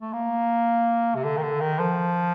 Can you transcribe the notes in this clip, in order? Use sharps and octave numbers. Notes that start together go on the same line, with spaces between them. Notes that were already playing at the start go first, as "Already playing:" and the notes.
A3
A#3
C3
D3
D#3
D3
D#3
F3